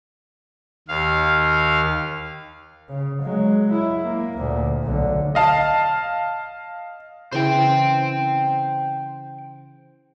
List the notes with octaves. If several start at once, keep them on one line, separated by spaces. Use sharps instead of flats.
D#2 F5
C#3
F#3 G#3
E4
A#3
D2 A#2
B1 D3
D#5 F5 A5
C#3 E3 C5 G5